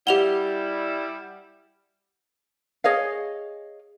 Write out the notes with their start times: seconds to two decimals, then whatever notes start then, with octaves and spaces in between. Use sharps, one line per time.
0.07 G3 E4 G4 F#5 F7 G7
2.84 G#4 C#5 D#5 F5